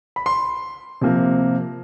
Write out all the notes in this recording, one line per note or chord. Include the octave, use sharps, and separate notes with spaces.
B5
C6
C3 F3 A#3